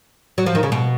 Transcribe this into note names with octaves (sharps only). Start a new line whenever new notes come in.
F#3
F3
D#3
C#3
B2